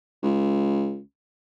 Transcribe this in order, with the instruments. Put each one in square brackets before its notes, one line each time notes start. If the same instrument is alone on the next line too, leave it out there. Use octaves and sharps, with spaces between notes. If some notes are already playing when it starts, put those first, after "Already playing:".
[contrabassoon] C#2